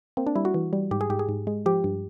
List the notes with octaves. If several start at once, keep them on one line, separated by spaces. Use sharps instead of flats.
A#3 C4
D4
G3 E4
F#4
E3
G3
G#2 G4
G#4
G#2 G4
G#4
G#2
G#3
F3 G4
G2